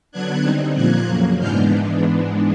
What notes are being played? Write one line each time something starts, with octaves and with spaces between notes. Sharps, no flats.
D3 F#3 B3 D4 F#6 G#6
D3 G3 C4 D#4
A#2 F3 A#3 F#6 G#6
F2 C#3 F#3 A#3
G#2 E3 G#3 B3 D4 F6 G6